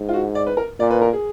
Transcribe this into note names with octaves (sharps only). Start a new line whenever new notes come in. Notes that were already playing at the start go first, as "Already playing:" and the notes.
Already playing: G#2
F4
F#4
D5
B4
A#4
A#2 D5
B4
A#4
G#4